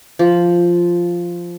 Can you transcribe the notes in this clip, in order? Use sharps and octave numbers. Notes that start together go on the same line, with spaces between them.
F3